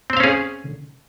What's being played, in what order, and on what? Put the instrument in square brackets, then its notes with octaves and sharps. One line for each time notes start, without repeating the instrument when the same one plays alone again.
[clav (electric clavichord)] C4
C5
F5
C#4
G#4